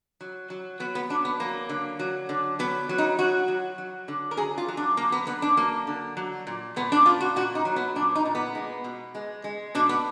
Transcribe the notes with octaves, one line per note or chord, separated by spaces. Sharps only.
F#3
F#3
F#3 B3
B3
F#3 D4
B3
F#3 A#3
D3
F#3
D3
F#3 B3
F#3
D#4
F#3 F#4
F#3
F#3
D3
A#4
F#3 G#4
F4
F#3
D4
D3 A#3
B3
D3 B3
D4
F#3 A#3
D3
F#3
A#2
A#2 B3
D4
A#2 F4
F#4
A#2 F#4
D#4
F#3
B3
A#2 D4
D#4
A#2
B3
G#3
B2
G#3
G#3
B2 D4
B3